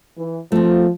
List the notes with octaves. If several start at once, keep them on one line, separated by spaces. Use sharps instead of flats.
E3
F3 A3 C4